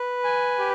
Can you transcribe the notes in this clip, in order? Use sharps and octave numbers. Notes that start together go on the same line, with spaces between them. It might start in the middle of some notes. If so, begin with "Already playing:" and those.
Already playing: B4
G#5
G4